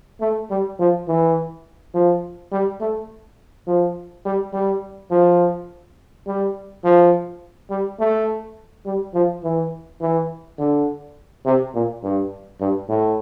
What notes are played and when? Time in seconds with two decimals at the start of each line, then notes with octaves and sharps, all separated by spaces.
0.21 A3
0.50 G3
0.79 F3
1.07 E3
1.94 F3
2.52 G3
2.81 A3
3.67 F3
4.25 G3
4.53 G3
5.11 F3
6.27 G3
6.84 F3
7.71 G3
8.00 A3
8.86 G3
9.14 F3
9.44 E3
10.01 E3
10.58 D3
11.45 C3
11.74 A#2
12.03 G2
12.61 G2
12.89 A2